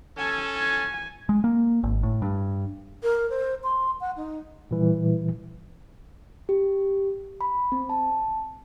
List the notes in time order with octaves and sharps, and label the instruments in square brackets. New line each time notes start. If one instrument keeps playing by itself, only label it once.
[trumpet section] C#4 A4 [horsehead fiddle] G#5
[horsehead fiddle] G#5
[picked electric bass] G#3
A#3
G#1
A2
G2
[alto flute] A#4
C5
C6
F#5
D#4
[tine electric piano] A#2 E3 G3
[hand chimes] G4
B5
C4
A5